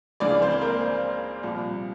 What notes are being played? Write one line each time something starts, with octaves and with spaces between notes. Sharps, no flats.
C#2 C#3 E3 D4 D5
C4 C5
A#3 A#4
C2 A#2 F3